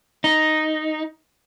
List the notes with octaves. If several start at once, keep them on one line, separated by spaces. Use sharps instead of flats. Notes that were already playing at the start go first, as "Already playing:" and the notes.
D#4